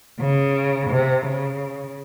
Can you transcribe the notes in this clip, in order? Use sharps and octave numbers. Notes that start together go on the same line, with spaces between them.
C#3
C3
C#3